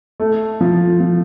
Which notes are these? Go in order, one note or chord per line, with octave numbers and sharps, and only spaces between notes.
A3
F3
F3